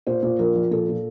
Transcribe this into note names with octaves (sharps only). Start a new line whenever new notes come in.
A#2 C5
A#2
A#1 A#4
A#1
A#2 A4
A#2